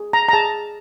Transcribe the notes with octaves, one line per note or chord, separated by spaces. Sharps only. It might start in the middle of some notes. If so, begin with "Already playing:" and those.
Already playing: G#4
A#5
A#5
G#4 A5